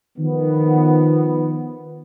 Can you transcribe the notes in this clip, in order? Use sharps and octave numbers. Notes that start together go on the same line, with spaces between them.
D#3 F3 B3